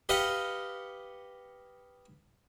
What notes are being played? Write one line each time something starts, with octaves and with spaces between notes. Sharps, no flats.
G4 B4 D#5 F5 F#5